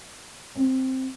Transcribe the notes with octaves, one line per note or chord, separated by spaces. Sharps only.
C4